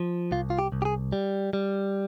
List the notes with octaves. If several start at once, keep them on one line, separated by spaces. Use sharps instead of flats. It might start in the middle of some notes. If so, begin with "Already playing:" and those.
Already playing: F3
C2 F4
F4
G4
C2
G4
G#4
G3
G3